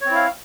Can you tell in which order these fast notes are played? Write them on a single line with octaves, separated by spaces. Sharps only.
C#5 C4 E4 F5